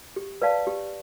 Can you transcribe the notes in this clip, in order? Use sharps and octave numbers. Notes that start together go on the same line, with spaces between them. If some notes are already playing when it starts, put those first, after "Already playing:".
G4
B4 D5 F5 A5
G4